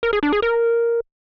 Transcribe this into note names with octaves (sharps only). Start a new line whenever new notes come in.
A#4
G#4
D4
G#4
A#4